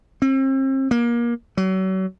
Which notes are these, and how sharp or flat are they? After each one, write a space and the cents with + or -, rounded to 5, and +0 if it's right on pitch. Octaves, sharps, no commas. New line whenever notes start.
C4 +40
A#3 +25
F#3 +35